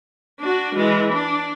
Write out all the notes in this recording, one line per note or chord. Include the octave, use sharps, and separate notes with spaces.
D4 F#4
E3 G#3
D4